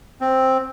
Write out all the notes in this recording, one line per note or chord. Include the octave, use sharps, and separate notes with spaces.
C4